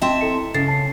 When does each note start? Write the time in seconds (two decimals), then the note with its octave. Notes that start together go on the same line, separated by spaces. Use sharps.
0.02 C4 D#5 E5 A5 C6
0.21 E4 A4 C#7
0.54 C#3 A4 A6 C7
0.68 A5 C7